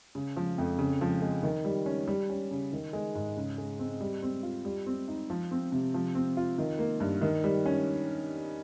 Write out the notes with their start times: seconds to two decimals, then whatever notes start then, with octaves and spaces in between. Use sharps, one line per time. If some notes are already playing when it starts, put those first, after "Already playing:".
0.15 C#3
0.36 F3
0.58 F2
0.79 C#3
1.01 F3
1.22 G#3
1.43 D#3
1.65 G3
1.86 C#4
2.07 G3
2.30 C#4
2.51 C#3
2.73 D#3
2.93 G#3
3.15 G#2
3.37 C#3
3.58 G#3
3.79 C4
4.01 G3
4.22 C4
4.43 F4
4.65 G3
4.86 C4
5.08 D#4
5.30 F3
5.51 C4
5.72 C3
5.94 F3
6.15 C4
6.37 F4
6.58 D#3
6.79 A#3
7.00 G2
7.21 D#3
7.44 G3
7.66 C#4